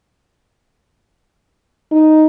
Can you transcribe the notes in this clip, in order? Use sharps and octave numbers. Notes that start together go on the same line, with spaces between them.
D#4